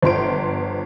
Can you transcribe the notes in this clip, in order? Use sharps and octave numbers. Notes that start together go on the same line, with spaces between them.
G1 F3 C6 D7